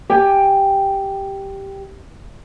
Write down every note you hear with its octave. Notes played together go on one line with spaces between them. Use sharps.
G4 G5 G#5